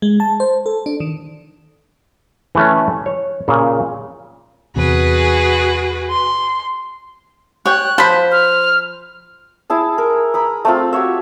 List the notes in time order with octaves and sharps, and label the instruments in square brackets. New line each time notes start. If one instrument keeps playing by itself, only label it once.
[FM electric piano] G#3
A5
C5
A4
D4
D#3
[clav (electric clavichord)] E3 A3 C#4
C#5
A#2 C#3
[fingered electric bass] E2 C3 [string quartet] F#4 G#4 B4
[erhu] C6
[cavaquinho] C#5 G5 [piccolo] F#6
[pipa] F3 B5 [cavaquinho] C5
[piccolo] F6
[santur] E4 G#4 A5
A#4
A#5 B5 D#6
A3 C4 F4
F#4 G4 C#5 E5